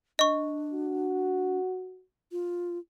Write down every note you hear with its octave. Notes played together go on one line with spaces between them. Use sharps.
D4 D#5 C#6
F#4
F4